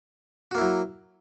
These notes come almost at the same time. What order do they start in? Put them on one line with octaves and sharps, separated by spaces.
F#4 A#3 E4 F#3